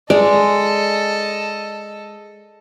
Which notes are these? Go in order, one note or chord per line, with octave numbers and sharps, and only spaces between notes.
G#3 A4 D5 D#5